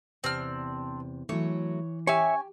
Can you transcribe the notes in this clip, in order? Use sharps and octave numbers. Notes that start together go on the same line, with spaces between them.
E2 C3 C4 D4 F6
E3 F#3 A3 C#5
C#4 G4 C#5 E5 G#5